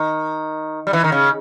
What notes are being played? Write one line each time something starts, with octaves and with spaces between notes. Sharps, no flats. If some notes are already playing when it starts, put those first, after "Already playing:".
Already playing: D#3
G3
E3
D#3
C#3